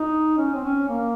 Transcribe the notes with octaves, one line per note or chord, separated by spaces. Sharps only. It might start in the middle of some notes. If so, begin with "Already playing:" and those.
Already playing: D#4
C#4
C4
C#4
A#3